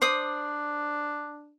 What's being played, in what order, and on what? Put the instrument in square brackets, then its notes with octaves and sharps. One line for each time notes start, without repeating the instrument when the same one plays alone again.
[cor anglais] D4 [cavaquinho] C5 D5 D#6